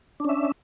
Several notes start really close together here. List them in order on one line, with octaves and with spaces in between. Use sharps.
D4 C#4 E5